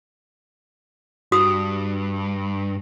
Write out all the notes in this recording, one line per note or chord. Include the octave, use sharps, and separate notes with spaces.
G2 F#4 D#6